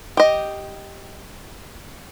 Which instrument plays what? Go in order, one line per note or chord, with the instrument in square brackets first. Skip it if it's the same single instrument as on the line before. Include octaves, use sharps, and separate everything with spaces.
[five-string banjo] G4 D#5